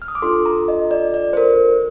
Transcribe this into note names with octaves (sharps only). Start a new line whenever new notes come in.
F6
D#6
D6
D4 F4 A4 C6
A#5
D#5
D5
D5
C5
A#4